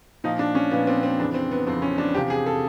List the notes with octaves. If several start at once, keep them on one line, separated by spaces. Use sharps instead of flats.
A#2 F3 D#4
D4
C#4
A#2 F3 B3
C4
C4
F2 C#3 E3 D4
C4
B3
F2 C#3 E3 C4
C#4
D4
E2 C3 F3 G4
G#4
A4